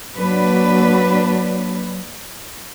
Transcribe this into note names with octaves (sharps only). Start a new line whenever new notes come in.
F#3 A#3 D4 B4